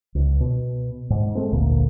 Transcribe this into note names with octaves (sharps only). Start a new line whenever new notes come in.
C#2
B2
G#2
G#3 A3 C4
G#1 D2 A#2 A#3